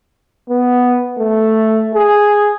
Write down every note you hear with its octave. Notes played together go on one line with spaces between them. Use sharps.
B3
A3
G#4